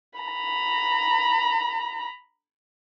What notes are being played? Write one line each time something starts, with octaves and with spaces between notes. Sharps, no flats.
A#5 B5